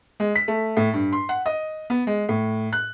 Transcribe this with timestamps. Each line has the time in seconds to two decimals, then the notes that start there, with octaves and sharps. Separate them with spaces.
0.20 G#3
0.35 B6
0.48 A3
0.77 A2
0.93 G2
1.12 C6
1.29 F#5
1.46 D#5
1.90 B3
2.07 G#3
2.29 A2
2.73 F#6